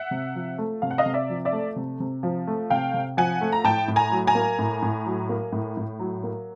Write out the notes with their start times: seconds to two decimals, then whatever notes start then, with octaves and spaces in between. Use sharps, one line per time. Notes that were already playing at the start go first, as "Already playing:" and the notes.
Already playing: E5 F#5
0.11 C3
0.35 F3
0.58 A3
0.82 C3 F5
0.91 F#5
0.98 D#5 F5
1.06 C3
1.14 D5 E5
1.29 F3
1.45 D5 E5
1.52 A3
1.76 C3
2.00 C3
2.23 F3
2.47 A3
2.70 C3 F5 G5
2.94 C3
3.17 F3 F#5 G#5
3.41 A3
3.52 A#5
3.64 A2 G5 A5
3.88 A2
3.96 G#5 A#5
4.11 F#3
4.27 G#5 A#5
4.35 A#3
4.59 A2
4.82 A2
5.06 F#3
5.29 A#3
5.52 A2
5.77 A2
5.99 F#3
6.23 A#3